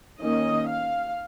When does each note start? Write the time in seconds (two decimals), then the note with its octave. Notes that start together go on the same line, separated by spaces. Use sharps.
0.22 D#3 A#3 C#4 D#5
0.69 F5